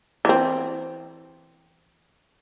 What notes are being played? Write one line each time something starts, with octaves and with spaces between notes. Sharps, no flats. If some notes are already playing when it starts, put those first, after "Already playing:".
E3 C4